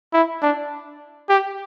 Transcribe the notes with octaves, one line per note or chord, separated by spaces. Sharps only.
E4
D4
G4